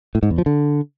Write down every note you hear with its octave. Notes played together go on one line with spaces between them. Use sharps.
A2
G#2
E2
F3
D3